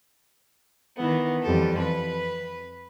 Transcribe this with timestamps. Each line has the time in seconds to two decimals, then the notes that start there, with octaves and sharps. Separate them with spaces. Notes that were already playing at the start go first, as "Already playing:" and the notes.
0.97 D#3 E3 B3
1.42 F2 E3 G3 G4 A4
1.79 B4 B5